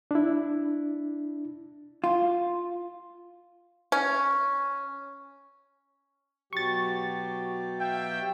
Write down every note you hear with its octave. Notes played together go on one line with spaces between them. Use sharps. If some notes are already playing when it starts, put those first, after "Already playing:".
D4 E4
F4
C#4
B2 F#3 G4 C#6 A6
E5 F5 G5